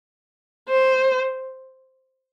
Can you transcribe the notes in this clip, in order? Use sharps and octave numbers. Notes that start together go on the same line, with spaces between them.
C5